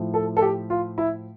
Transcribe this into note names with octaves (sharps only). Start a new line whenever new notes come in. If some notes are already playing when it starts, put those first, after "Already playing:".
Already playing: A2 F3
A4
A4
G4
F4
E4